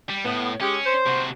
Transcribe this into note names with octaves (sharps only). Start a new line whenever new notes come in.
G3
A2 B3
G#3 C#4 G4
C5
C3 F#4